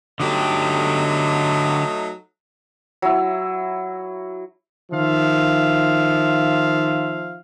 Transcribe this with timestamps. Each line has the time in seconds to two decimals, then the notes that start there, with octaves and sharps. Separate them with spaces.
0.20 D3 F#3 A3 D#4 G4
3.02 F#3 E4
4.92 D#3 F3 E5 F5